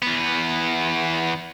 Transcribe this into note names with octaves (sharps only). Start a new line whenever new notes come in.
E2 B3